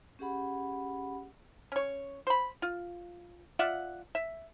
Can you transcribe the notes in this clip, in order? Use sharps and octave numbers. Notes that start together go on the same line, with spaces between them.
C#4 G4 G#4 F#5 B5
C#4 C#5
C5 B5
F4
F4 D5 E5 F#5
E5